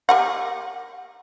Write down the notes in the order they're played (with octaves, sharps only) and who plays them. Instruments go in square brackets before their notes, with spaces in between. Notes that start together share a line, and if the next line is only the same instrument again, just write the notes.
[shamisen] G4 A#4 F#5